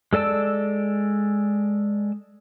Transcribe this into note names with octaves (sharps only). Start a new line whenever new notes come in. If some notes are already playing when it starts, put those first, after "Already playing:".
G#3 A4 D5 A5 E6